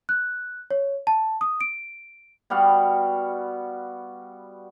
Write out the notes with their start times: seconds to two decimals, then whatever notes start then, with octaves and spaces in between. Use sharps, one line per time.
0.09 F#6
0.71 C#5
1.07 A5
1.41 D#6
1.61 D7
2.50 G3 B3 F#4 F5